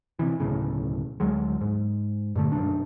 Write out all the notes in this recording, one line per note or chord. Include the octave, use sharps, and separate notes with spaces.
C3 E3
D1 B1 A2 C#3
D2 F#3 G#3
G#2
G2 A#2 D3 A3
B1 F#2 D4